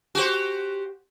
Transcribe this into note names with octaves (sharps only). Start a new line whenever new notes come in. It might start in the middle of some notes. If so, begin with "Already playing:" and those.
F#4 G4 C5